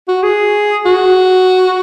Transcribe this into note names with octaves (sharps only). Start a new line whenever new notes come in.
F#4
G#4
F#4